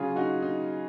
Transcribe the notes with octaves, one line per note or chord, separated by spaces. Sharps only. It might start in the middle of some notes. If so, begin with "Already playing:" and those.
Already playing: C#3 F#3 F4 G#4
D#4 F#4
D#4